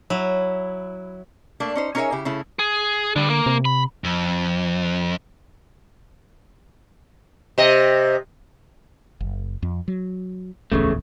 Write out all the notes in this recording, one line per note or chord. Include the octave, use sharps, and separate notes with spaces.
F#3 E4
A3 A#3 D4
C#4 D#4 C5
C#4 D#4 G#4 A#4 C#5 E5
C#3 E4 G4
C#3 A3 E4
G#4
D3 G3 D4
A#3
C3
B5
F2
C3 D#5
F#1
F2
F#3
D1 A#1 E2 C#3 A3